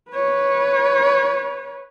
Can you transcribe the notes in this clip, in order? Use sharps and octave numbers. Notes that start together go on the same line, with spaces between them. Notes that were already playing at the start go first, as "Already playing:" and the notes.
B4 C#5